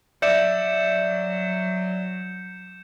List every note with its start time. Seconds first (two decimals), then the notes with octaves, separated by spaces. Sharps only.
0.22 F#3 D5 E5 G6 C#7 E7